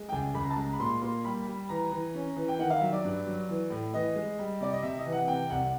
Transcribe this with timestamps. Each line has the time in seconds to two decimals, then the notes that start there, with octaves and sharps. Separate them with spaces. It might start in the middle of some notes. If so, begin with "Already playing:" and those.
Already playing: G#3
0.09 G5
0.12 C#2 G#5
0.34 C#2 B5
0.43 A#5
0.50 A5
0.57 G#3 A#5
0.73 B5
0.80 A#2 C6
1.02 A#3 C6
1.25 G3 B5
1.47 G3
1.69 E3 A#5
1.92 E3
2.15 C#4
2.36 E3
2.48 G5
2.59 D#3 F#5
2.70 F5
2.81 F#3 E5
2.93 D5
3.04 G2
3.27 F#3
3.49 E3
3.70 A2
3.94 E3 D#5
4.16 G#3
4.39 G3
4.60 C3 D5
4.73 D#5
4.82 C3 E5
4.98 D#5
5.06 E3
5.12 F#5
5.28 C3 G5
5.50 C2 F#5